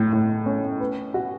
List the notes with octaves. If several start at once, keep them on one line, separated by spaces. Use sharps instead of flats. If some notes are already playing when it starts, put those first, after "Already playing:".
Already playing: A2
A2
C#4
B4
F#4